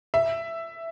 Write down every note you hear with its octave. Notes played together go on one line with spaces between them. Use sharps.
E5